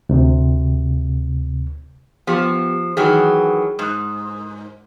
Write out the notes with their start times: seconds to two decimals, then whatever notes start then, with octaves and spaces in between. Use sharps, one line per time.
0.09 D2 C3
2.27 F3 B3 G4 C#7
2.97 D#3 E3 F#3 G#4
3.79 G#2 D#6 F#6